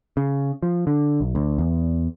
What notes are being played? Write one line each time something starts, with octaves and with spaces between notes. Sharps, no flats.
C#3
F3
D3
B1
D2
E2